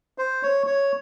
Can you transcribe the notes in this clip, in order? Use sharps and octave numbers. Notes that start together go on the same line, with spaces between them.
C5
C#5
C#5